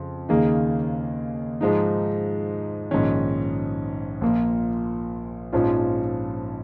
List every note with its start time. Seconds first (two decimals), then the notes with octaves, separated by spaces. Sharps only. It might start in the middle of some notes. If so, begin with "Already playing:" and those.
Already playing: F2 C#3
0.29 D#2 C#3 A#3 D#4 G#4
1.61 G#2 F3 G#3 D#4
2.91 A#1 G#2 D#3 C#4
4.21 A#1 A#2 A#3
5.53 A#1 G#2 F3 C#4 F4